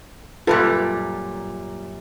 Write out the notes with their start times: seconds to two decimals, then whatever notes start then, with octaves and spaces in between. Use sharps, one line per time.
0.47 F#2 A#2 G3 F4 A4 B4